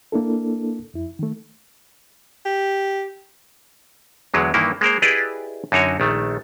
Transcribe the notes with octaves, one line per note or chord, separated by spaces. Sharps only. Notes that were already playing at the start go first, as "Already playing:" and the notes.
A#3 D4 E4 A4
F2 E4
D#3 A3
G4
E2 D3 F#3 G#3
G2 D#3 E3 A#3 E4
G#3 A#3 A#4 C5
E4 G4 G#4 B4 D5 D#5
F#2 D3 D#4 F#4 C#5 G#5
A#1 D#3 A3